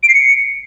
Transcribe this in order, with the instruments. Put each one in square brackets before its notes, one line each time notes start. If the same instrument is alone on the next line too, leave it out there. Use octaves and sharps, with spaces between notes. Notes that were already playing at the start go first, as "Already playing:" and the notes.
[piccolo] D7
C7
C#7